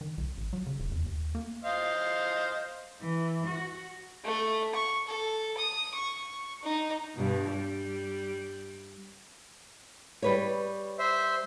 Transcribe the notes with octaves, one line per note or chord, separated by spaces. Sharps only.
D#3
C2
A1
F#3
C#3
D#1
E2
D#2
A#3
C5 D#5 F5
E3
F#4
A3
C#6
A4
D#6
C#6
D#4
G2 B2
G3
G3 B4 C#5
C5 E5